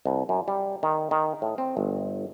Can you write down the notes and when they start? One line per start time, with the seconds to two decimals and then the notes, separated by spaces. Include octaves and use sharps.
0.06 C2
0.29 F#2
0.48 G3
0.83 D#3
1.11 D#3
1.42 A2
1.58 C4
1.77 G1